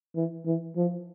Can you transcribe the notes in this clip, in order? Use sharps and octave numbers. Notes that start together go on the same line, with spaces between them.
E3
E3
F3